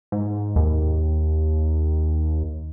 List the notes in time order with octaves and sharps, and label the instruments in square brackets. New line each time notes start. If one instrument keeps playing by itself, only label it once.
[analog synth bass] G#2
D#2